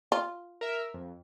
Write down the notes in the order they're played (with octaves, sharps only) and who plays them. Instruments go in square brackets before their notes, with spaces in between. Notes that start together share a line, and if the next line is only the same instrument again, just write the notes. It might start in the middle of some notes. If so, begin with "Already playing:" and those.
[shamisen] F4
[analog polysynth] A#4 E5
F2